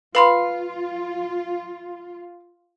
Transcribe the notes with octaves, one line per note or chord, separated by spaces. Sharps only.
F4 B4 F5 B5 C6